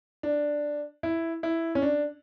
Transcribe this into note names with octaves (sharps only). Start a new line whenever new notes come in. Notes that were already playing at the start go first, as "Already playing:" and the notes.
D4
E4
E4
C#4
D4